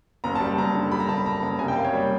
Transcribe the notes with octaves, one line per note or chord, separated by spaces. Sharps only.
F#1 A#5
A5
G3
F#1 A#5
D3
G3 B5
A#5
F#1 A5
B5
F#1 A#5
F#1 A#5
C2 G#5
G5
A#3 F5
C#5
G3